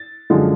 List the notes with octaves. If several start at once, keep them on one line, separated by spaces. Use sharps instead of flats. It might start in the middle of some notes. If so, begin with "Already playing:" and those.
Already playing: A6
F#2 D3 F3 G#3